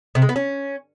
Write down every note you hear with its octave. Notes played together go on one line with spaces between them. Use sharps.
C3
G#3
B3
C#4